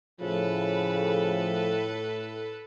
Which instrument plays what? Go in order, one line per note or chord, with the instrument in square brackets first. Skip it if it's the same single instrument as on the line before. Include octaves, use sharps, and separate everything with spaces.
[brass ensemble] A2 [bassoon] C#3 [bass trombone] F3 [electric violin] A4 B4